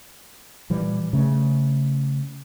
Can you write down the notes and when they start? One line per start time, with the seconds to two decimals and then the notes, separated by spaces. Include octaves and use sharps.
0.70 A#2 E3 G3
1.13 C#3 A3